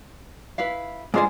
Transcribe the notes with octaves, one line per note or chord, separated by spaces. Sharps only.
E4 B4 F5
G#2 G#3 D4 F4 C5